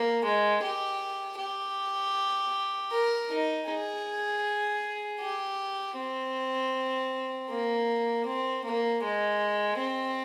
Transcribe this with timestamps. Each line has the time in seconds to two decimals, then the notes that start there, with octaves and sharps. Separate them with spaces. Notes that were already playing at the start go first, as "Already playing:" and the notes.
Already playing: A#3
0.24 G#3
0.63 G4
1.38 G4
2.91 A#4
3.30 D#4
3.68 G#4
5.21 G4
5.97 C4
7.50 A#3
8.26 C4
8.65 A#3
9.03 G#3
9.78 C4